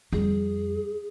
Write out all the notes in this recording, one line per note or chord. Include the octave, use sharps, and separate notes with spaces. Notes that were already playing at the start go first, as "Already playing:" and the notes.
F2 G3 G#4